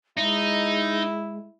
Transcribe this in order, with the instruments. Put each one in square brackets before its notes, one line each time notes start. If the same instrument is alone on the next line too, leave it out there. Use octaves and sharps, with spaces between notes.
[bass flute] G#3 [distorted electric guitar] D#4 [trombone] E4